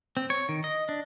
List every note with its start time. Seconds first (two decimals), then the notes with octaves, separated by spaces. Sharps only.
0.17 C4
0.30 C#5
0.49 D#3
0.64 D#5
0.89 D4